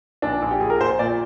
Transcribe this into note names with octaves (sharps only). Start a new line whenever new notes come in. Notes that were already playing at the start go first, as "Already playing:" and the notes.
A#1 D4
A#1
G4
A#1 G#4
A#4
A#1 C5
A#2 D5